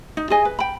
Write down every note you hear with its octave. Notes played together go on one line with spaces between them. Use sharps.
D#4
G#4 D#5 G#5
B4
G5 B5